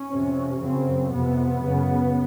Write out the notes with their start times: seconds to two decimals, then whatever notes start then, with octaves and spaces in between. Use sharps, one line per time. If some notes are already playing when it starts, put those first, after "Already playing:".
Already playing: C#4
0.10 F2 C3
0.61 F#2 C#3 C4
1.12 F2 C3 B3
1.62 F#2 C#3